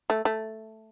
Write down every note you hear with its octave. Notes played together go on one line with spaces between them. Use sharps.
A3
A3